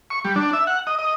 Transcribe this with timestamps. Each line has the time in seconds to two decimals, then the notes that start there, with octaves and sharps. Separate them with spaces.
0.10 C#6
0.25 G3
0.36 D4
0.53 E5
0.67 F#5
0.87 D#5
0.99 D#5